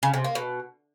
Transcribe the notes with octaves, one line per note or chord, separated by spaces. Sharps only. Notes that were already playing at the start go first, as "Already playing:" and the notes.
C#3
C3
A#3
B2